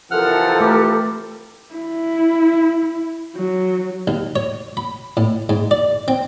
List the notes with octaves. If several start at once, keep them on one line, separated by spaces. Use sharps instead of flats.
C3 E3 F3 A4 A#4 F#5 F6
A3 G4 B4
E4
F#3
D#2
C#5
B5
A2
G#2
D5
C4